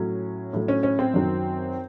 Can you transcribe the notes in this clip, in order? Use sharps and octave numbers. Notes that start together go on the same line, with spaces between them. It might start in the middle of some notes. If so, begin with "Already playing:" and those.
Already playing: A2 F#3 C#4
A2 F#3
C#4
C#4
C4
F#2 D#3 F#3